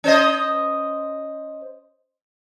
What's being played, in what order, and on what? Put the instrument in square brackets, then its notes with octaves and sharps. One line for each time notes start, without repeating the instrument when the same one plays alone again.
[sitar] C#4 C5 D#5